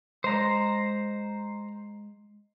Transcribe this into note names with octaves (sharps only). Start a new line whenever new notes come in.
G#3 C5 D#5 A#5